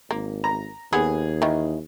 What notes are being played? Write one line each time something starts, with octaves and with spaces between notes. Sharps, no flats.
G#1 A#3
A#5
D#2 B3 G#4
D#3 E3